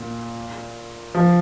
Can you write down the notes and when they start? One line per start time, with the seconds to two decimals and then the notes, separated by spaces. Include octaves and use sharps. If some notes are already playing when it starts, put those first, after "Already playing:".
Already playing: A#2
1.15 F3